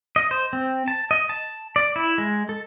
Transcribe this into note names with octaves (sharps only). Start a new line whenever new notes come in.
D#5
C5
C4
A5
D#5
A5
D5
E4
G#3
A4